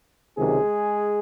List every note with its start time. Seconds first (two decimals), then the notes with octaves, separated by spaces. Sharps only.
0.37 C#2 C3 D#3 F#3 G#3 G#4